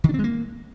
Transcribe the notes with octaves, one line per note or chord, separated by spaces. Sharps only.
D#3
D4
C4
G#3
A#3